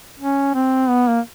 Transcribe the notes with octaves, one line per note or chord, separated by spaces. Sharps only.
C#4
C4
B3
A#3